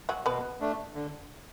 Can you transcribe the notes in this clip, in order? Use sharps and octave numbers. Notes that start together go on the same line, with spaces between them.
F#3 F#4
B2 B3 B4
A3 D4
D3